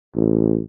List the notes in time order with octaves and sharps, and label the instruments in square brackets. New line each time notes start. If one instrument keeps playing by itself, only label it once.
[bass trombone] A1